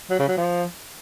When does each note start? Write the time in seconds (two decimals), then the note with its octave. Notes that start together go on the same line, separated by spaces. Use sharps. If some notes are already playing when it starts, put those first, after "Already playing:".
0.10 F#3
0.19 C#3
0.28 F#3
0.37 F3